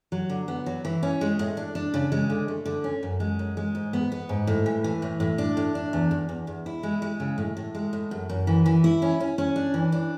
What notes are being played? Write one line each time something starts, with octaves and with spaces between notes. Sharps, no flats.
F#3
D3
B3
F#3
E3
C#4
G#3
A2
D4
D4
C#3
G#3
D3
A3
D3
C#4
F#2
G#3
F#2
G#3
G#2
B3
B3
G#2
A2
E3
E3
A2
A2
D4
A2
D4
E2
E2
E2
E2
E4
G#3
G#3
C#3
A2
A2
G#3
A2
F#2
F#2
E3
E3
E4
C#4
C#4
C#4
D4
E3
D4